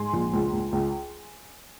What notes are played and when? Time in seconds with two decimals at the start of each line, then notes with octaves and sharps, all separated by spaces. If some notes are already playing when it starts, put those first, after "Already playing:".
Already playing: G#2 G#5 C6
0.13 A#1
0.33 C#2
0.52 C#2
0.72 C#2